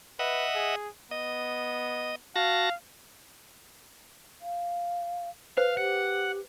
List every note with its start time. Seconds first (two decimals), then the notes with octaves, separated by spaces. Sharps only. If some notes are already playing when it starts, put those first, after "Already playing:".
0.19 B4 D#5 E5 F#5
0.54 G#4
1.11 B3 D#5
2.36 F#4 F5 A5 A#6
4.42 F5
5.57 B4 C5 F5
5.77 G4 F#5